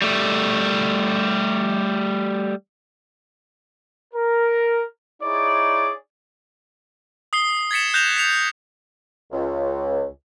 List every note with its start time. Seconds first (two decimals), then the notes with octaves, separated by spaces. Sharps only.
0.02 G3 A3
4.14 A#4
5.22 D#4 E4 G#4 C#5 D5
7.33 D#6 C7 G7
7.71 G#6 A6 B6 C#7 E7
7.94 F#6 G6 A#6 E7 F7
8.16 B6 C#7 F7
9.32 C#2